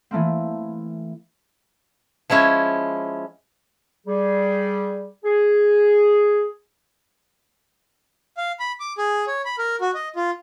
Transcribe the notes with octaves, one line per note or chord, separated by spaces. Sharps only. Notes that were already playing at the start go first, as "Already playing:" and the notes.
E3 A3 A#3 C4
F3 G#3 C#4 E4
G3 G#4
G#4
F5
B5
D6
G#4
C#5
B5
A#4
F#4
D#5
F4